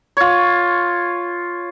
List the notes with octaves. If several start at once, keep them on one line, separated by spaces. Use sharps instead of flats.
F4 C#5